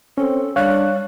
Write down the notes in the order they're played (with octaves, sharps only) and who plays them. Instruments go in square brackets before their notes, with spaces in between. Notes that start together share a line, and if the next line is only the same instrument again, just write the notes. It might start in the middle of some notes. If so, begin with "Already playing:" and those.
[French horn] C4 [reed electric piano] C#4 [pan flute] A4
[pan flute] G3 [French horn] D4 [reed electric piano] C#5 [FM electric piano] F5 F#6